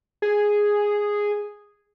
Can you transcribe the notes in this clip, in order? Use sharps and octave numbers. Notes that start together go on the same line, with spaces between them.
G#4